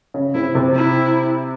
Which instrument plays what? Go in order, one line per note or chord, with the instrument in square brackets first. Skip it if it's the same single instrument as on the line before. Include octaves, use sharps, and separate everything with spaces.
[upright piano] C#3
[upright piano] C3 [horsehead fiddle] E4
[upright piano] C3
[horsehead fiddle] E4